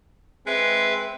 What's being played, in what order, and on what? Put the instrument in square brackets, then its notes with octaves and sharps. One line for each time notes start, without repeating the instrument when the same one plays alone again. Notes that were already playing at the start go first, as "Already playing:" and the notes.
[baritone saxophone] G#3 [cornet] C4 [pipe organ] B4 E5